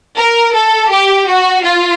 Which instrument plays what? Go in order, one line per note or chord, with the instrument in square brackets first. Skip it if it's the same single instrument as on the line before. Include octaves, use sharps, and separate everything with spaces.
[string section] A#4
A4
G4
F#4
F4